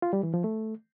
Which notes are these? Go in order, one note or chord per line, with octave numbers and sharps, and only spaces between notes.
F4
G3
E3
F3
A3